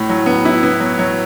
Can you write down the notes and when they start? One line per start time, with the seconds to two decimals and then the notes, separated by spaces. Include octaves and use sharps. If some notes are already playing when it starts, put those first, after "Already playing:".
Already playing: A2
0.10 F#3
0.26 B3
0.45 E4
0.63 B3
0.80 F#3
0.99 F#3